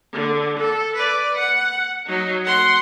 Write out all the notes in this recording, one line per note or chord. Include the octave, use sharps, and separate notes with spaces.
D3
A4
B4 D5
F#5
F#3 D#4
F#5 C6